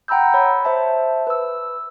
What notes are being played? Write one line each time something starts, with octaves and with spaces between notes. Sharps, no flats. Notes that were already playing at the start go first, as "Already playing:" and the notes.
F#5 G5 A#5 B5 E6 G6
C#5 B5
C5 E5 A5
B4 E6